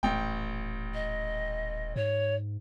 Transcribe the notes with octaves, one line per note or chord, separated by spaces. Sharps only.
D#1 A1 G5
D#5
G#2 C#5